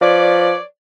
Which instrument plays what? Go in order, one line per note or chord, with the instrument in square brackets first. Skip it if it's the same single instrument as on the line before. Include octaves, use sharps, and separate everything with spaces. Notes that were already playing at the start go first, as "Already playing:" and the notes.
[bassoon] F3 [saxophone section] B4 C#5 D5